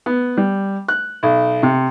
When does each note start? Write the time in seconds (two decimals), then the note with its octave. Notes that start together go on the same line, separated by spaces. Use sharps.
0.06 B3
0.37 G3
0.88 F#6
1.23 B1
1.63 C3